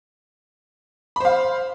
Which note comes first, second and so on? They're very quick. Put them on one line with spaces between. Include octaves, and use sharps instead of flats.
B5 C5 F5